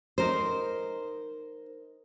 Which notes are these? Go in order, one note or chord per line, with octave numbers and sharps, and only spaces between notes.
D#4 A#4 C5